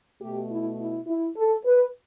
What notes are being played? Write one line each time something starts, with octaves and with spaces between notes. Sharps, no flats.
B2 A3 G4
E4
E4
E4
A4
B4